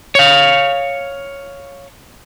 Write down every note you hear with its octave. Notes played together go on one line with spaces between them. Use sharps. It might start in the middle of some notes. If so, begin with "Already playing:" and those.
C#5 F5